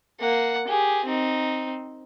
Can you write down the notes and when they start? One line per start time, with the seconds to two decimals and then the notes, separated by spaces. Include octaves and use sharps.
0.20 A#3 F#5
0.67 G4 G#4
1.05 C4 D#4